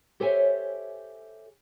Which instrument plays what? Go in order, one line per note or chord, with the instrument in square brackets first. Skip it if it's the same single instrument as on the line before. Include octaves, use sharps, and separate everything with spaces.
[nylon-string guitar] G4 A4 C5 C#5 E5 G#5